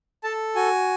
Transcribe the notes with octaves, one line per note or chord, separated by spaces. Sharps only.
A4 A5
F#4 G#5